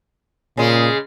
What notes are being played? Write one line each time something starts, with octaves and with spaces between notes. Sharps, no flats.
A#2 C#3 G#3